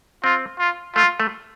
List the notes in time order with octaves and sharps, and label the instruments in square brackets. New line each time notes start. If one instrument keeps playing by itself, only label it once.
[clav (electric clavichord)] C4 [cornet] F4
[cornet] F4
[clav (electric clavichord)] A3 [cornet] F4
[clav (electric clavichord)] A3